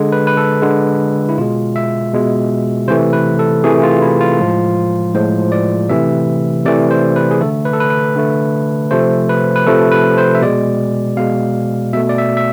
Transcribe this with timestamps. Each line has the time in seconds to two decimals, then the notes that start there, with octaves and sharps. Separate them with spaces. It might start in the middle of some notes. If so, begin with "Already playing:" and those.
Already playing: D3 G#3
0.12 B4
0.27 B4
0.37 A4
0.62 D3 G#3
1.29 E4
1.38 B2 G#3 F4
1.76 E5
2.13 B2 G#3
2.88 C3 E3 A3 C5
3.13 B4
3.39 A4
3.64 C3 E3 A3 G#4
3.83 F4
4.02 E4
4.21 F4
4.39 A2 F3 G#3
5.14 A2 F3 G#3 C5
5.52 D5
5.89 C3 E3 A3 E5
6.65 C3 E3 A3 D5
6.91 C5
7.16 B4
7.31 G#4
7.41 D3 A3 A4
7.65 B4
7.73 A4
7.80 B4
7.90 B4
8.16 D3 A3
8.91 C3 F3 A3 C5
9.29 B4
9.56 B4
9.66 C3 F3 A3 A4
9.91 B4
10.18 C5
10.35 E5
10.42 B2 G#3 D5
11.17 B2 G#3 F5
11.93 B2 E5
11.97 A3
12.09 D5
12.18 E5
12.37 E5